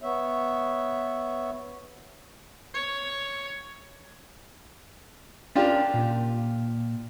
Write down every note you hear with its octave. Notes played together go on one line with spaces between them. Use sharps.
B3 C#5 E5
C#5
C#4 D4 F4 G4 A#4
A#2